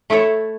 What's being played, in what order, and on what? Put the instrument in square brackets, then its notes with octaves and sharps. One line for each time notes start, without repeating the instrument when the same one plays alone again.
[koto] A3 E4 A4 C#5